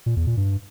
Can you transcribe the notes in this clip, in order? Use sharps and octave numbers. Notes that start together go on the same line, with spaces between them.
A#2
E2
A#2
G2